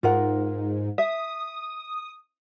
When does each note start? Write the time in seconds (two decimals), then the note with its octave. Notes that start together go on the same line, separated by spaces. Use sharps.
0.03 G#2 F4 A#4 F#5
0.98 E5 D#6